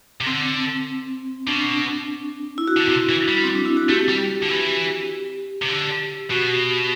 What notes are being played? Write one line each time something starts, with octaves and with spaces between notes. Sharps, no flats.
C3
D3 C4
B2 D4
E4
F#4
D3
C3
E3
G3
C4
D4
E4
F#4
A3 G4
G3
D3
E3
C3
D3
B2 F#4